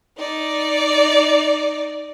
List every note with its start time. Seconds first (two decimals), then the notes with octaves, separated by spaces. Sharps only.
0.18 D#4 D5